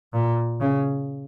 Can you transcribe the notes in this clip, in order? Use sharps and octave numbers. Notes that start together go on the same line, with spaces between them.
A#2
C#3